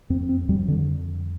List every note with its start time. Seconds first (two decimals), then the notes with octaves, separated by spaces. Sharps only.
0.10 F2 C4
0.29 C4
0.49 F2 G3
0.68 D3